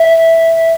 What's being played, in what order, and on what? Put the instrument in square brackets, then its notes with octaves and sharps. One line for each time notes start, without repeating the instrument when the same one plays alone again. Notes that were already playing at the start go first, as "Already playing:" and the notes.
Already playing: [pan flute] E5